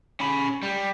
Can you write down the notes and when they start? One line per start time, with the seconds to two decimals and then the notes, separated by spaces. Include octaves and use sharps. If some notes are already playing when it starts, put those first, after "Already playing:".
0.20 C#4 B5
0.63 G3